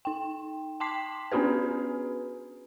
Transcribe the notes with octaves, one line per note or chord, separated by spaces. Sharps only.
D#4 G5
G5 A5 C6 D6 B6 C7
B3 C#4 D4 F#4 G#4 B4